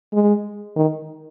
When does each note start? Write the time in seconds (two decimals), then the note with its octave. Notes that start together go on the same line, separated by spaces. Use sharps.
0.13 G#3
0.76 D#3